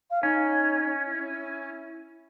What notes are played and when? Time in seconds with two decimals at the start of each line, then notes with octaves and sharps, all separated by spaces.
0.11 F5
0.23 C#4 D#4
1.06 E4